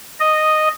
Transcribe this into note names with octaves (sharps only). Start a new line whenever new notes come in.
D#5